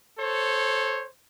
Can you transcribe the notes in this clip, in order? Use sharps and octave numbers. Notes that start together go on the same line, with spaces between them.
A4 C5 C#5